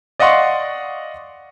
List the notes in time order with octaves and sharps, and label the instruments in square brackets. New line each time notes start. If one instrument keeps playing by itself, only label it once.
[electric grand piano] D5 D#5 F5 F#5 C6 C#6